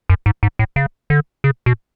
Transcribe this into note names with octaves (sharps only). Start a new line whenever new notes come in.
F#2
G#2
G#2
A2
C#3
D3
C#3
B2